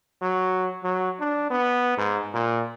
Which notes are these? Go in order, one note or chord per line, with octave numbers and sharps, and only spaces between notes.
F#3
F#3
D4
B3
G#2
A#2